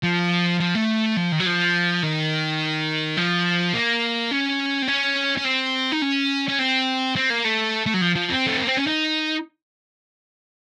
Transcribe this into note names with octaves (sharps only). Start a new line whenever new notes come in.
F3
F3
A3
F3
D#3
F#3
F3
D#3
F3
A#3
C#4
C4
C#4
C#4
C4
D#4
C#4
C#4
C4
C4
A#3
A3
A3
F#3
F3
F3
C4
A3
A#3
C4
C#4
D#4